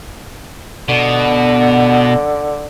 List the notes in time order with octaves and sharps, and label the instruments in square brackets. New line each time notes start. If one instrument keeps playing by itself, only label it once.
[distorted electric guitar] B2 [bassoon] D3